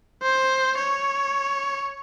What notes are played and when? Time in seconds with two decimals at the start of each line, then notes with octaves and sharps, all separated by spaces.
0.22 C5
0.78 C#5